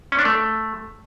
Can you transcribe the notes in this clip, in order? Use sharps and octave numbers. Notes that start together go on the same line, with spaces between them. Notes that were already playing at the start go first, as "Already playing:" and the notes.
C#4
D4
A3